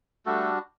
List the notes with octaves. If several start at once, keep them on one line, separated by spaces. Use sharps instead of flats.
G3 A3 D4 F#4 A4